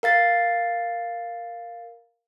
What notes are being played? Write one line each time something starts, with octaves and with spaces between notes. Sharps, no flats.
A#4 F5 A6 C7